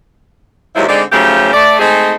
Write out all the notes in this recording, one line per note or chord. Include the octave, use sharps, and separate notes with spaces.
D#2 C3 F3 F#3 G#3 E4
D3 G#3 C4 D#4 D5
G#2 C#3 F3 F#3 A3 G4
A3 D5
G#3 A3 C4 D#4 G#4